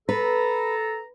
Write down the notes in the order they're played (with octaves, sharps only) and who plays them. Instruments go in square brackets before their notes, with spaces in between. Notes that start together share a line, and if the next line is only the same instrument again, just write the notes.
[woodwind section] A4 A#5 [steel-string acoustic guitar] B4